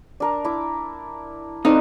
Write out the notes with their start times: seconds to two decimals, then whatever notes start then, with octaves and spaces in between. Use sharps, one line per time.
0.20 D4 A#4 A5
0.45 E4 D6
1.65 C4 D#4 A4 C5 D5 F5